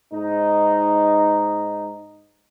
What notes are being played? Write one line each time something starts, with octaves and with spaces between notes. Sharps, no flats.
G#2 D#4